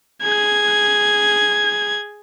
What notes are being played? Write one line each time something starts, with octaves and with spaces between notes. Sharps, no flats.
G#4 G#6